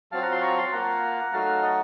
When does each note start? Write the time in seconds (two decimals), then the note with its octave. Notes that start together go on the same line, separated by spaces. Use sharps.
0.12 F#3 C4 F4 F5 A5
0.22 F#5 A#5
0.32 A5 C6
0.42 A#5 C#6
0.58 A5 C6
0.72 A#3 F4 F#5 A#5
1.32 F#3 A3 D#4 F#4 F5 A5
1.62 D#5 F#5